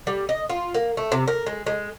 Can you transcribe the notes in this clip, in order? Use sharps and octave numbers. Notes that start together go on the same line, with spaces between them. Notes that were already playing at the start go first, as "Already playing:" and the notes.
G3
D#5
F4
A#3
A3
C3
A#4
G#3
G#3